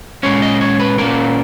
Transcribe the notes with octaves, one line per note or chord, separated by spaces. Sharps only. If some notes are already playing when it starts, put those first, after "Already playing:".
A#2 G#3 C#4 C#5
D#5
C#5
B4
A#2 A#3 C#4 A#4